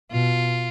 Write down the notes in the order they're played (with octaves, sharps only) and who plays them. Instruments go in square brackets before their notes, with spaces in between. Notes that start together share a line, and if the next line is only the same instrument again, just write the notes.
[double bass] B2 [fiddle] F4